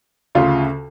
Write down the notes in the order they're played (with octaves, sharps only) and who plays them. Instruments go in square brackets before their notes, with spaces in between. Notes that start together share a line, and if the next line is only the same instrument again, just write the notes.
[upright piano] D2 C#3 F4